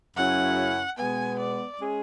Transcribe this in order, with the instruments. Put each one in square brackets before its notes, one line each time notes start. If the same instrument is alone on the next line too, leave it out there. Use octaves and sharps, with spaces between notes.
[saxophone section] F#2 C#3 F#3 C#4 E4 [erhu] F#5
[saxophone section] B2 G#3 B3 [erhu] G#5
[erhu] D5
[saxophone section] G#3 C#4 G#4